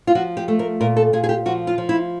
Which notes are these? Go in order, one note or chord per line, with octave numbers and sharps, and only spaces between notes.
F4
F3 F#4
G4
A3
A#4
A#2 A#4
A4
A#2 G#4
G#4
G4
F3 F#4
F4
F3
E4